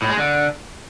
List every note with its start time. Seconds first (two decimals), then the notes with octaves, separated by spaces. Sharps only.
0.02 A2
0.10 G#3
0.18 D3